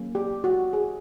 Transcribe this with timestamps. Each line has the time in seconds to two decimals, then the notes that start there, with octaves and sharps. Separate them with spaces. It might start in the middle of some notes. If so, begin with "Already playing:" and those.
Already playing: F#3 A#3 C#4
0.15 G4
0.44 F#4
0.73 G#4